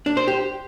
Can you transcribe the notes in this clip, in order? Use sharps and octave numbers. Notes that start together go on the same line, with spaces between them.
D4
C5
G4